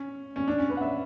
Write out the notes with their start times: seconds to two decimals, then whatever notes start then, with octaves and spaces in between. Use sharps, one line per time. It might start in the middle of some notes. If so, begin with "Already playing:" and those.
Already playing: C#4
0.36 C#4
0.48 D4
0.58 C#4
0.70 B4
0.77 F#5
0.81 E5